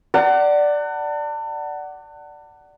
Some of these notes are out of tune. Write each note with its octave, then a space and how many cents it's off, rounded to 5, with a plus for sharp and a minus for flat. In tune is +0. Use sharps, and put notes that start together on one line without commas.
D5 +0 F#5 +20 A5 +40